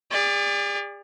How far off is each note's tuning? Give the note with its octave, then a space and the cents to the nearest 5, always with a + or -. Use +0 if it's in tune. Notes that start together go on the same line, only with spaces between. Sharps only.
G#4 -45 D5 +0